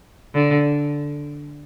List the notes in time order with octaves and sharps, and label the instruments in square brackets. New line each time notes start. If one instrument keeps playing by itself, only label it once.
[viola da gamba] D3